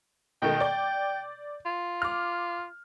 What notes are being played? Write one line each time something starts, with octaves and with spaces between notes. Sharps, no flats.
B2 D#3 A3 G5
D5 G6
F4
D6 F6